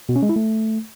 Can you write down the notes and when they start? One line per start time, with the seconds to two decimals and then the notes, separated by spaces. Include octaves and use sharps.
0.09 B2
0.16 C#4
0.22 G#3
0.29 E4
0.36 A3